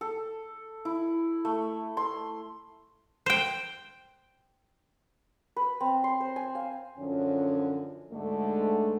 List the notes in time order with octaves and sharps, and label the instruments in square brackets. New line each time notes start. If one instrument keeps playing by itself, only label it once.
[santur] A4
E4
A3
C6
[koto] C5 G5
[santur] B4
C4
C6
C5
G#5
F5
[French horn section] F#2 D3 F3 C#4
D2 G#2 D3 G#3 A3